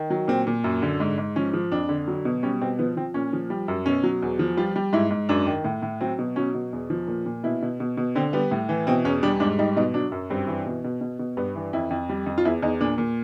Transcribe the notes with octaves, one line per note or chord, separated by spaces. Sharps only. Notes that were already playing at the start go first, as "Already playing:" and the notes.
Already playing: D#3
F#3
A#2 C4
A#2
F#2
D3
G#2
G#2
F3 C#4
F3
F2 D4
D3
F#3
B2
G3 C#4
B2 C4
F3 B3
F3 C4
A#2 C#4
F3
G3
F#2
B2 C#4
F#3
E2
F3
G3 F4
G3
G#2 E4
G#2
F#2 D4
D#3
A2
A2
F#3 C4
B2
F#3 C#4
B2
E2
F3
A#2
A#2
B2 E4
B2
B2
B2
D3 C4
G3 B3
A2
E3
B2 C4
E2 C#4
G3 D4
G#2 D4
G3 D#4
B2 D#4
F#3 D4
F#2
G2 C4
E3
B2
B2
B2
B2
G2 B3
E3
F2 E4
F2
G3
F2
F4
E2 E4
E2 D#4
A#2 D4
A#2